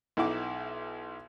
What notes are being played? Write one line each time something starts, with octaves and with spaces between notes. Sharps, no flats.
B1 D#4 E4 F#5 D6